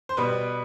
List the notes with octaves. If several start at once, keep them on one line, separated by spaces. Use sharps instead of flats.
C5
B2 G3 B4